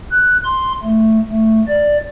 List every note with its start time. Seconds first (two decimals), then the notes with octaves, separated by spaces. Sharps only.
0.11 F#6
0.45 C6
0.83 A3
1.30 A3
1.68 D5